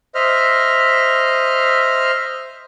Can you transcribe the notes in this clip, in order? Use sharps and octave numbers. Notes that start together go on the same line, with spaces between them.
C5 D#5 E5 F6